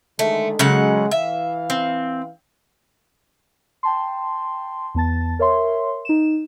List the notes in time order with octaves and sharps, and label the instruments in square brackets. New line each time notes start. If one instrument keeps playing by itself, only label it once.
[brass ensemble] D3 D#3 G#3 [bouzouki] A3
[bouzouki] C#3 F#3 F#5 [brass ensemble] G#3
[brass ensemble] E3 F5 [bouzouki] E5
[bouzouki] C4
[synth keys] G5 A5 C6
E2 B3 A5 A6
A#4 C#5 E5 C6
D#4 E7